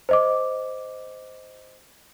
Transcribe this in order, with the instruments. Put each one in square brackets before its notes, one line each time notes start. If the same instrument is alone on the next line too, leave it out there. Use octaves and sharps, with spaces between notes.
[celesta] C5 D#5 D6